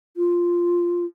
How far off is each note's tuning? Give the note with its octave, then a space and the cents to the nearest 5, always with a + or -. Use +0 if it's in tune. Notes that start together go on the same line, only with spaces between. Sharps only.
F4 -5